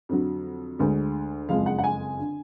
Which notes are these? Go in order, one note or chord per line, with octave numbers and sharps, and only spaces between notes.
F2 D3 F#3
D2 D3 G#3
F#1 F2 F3 G#3 F5
F#5
F#5
G#5
D3